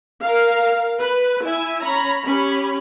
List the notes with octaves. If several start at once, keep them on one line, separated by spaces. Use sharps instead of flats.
A#4 F5
B4
E4 E5 G#5
C#4 C#5 A#5 B5
C#4 G4 B5